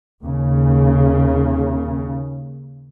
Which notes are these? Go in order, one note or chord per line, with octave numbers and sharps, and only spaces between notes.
D#2 C#3